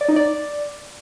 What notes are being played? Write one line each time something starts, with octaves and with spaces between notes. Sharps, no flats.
D5
D#4
D5